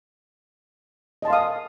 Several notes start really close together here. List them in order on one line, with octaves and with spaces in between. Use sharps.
D#5 A5 C6 F5 D#6